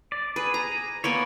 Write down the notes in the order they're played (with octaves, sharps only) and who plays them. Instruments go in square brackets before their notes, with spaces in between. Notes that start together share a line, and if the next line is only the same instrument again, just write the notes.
[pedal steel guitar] D5
[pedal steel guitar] G#4 [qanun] B4
[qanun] A#5
[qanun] A#3 B3 G#5 [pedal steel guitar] C#5 D5